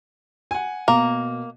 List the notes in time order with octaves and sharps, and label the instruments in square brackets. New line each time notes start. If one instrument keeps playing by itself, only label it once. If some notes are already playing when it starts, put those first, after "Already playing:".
[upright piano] F#5 G#5
[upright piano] B2 [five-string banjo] A#3